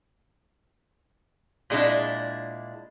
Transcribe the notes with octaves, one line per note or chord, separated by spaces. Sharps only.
A#2 G#3 D4 E4